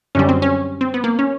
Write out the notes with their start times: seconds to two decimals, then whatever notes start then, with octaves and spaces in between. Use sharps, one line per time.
0.15 F#2 D3 G3 C#4
0.29 C4
0.42 C#4
0.81 C4
0.94 B3
1.04 A#3
1.19 C#4